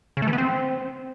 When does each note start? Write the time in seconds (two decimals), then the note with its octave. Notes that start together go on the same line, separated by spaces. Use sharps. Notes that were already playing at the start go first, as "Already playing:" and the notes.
0.17 C#3
0.22 A3
0.28 E3
0.33 B3
0.38 C4